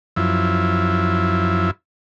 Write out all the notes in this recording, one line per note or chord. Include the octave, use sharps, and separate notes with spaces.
F#2 F3 E4